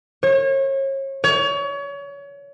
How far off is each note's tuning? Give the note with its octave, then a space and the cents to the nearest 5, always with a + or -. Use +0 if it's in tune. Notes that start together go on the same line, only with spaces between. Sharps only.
C#5 -35
C#5 +30